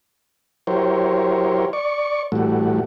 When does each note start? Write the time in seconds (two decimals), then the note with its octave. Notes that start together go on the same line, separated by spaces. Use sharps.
0.67 F#3 E4 G4 A#4 C5 C#5
1.73 D5 C#6
2.32 A2 E3 G3 A3 F#4